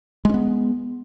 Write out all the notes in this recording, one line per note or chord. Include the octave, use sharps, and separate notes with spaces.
G#3 B3 C#4